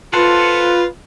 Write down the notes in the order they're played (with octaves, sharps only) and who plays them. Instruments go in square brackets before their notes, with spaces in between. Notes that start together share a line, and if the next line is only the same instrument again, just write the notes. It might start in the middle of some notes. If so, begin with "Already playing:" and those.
[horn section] F4 B4 [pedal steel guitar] A4 C5 F#5